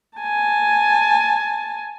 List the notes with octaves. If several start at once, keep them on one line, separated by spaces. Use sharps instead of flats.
G#5 A5